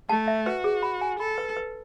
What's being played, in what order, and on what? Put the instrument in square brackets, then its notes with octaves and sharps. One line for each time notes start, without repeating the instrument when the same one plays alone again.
[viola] A3 [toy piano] A5
[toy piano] E5
[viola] F#4 [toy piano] B4
[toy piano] G#4
B5
G#5
[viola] A4 [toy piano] B5
[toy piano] B4
B4